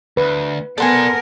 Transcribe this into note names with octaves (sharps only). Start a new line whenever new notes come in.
D2 B4
B3 A4 A#4 D5 F#5 G#5 C6